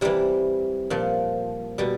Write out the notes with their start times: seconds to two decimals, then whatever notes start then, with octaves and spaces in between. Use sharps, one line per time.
0.01 C3 E3 G3
0.90 A#2 F3
1.78 B2 G3